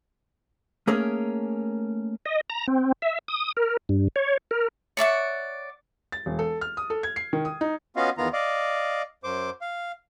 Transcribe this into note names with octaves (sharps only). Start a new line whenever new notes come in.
A3 A#3 C#4 G#4 A#4
D#5
A#5
C4
E5
D#6
A#4
G2
C#5
A#4
C#5 D5 E5 F#5
A6
E1
A4
F6
D#6
A4
G#6
C7
D#3
D#6
D#4
B3 C#4 F4 F#4 D#5 F5
E2 D#3 B3 F4 A#5
D5 D#5 F5
F#2 C5 D6
F5